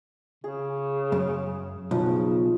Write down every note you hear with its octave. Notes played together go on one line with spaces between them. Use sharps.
C#3 G#4
F#2
B1 C#3 F3